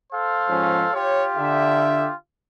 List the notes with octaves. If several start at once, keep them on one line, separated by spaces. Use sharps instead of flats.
A4 C5 F5
G#2 F3 C#4
F4 G4 C#5
D3 E5